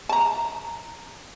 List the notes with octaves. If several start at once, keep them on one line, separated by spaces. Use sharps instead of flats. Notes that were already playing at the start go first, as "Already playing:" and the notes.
A5 A#5